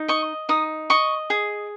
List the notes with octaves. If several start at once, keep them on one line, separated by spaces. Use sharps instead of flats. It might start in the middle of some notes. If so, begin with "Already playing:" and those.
Already playing: D#4
D#5 C#6
D#4 D#6
D#5 C#6
G#4